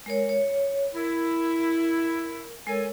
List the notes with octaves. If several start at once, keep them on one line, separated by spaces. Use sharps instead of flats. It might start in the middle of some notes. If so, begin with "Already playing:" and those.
G#3 A#4 C#5
C#5
E4 A#4
G#3 A4 A#4 C#5 G#5